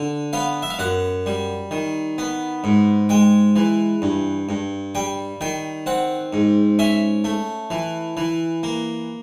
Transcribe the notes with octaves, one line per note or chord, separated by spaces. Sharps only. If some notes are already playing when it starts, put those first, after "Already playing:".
Already playing: D3
B3 F5
E5
F5
F#2 F#5
G3
D#3
B3
G#2
G#3 G5
E3
G2
G2
G3 G5
D#3 G5
C4 F#5
G#2
C#4 E5
A3
E3
E3
A#3